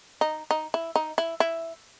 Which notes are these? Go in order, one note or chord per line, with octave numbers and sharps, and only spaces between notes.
D#4
D#4
E4
D#4
E4
E4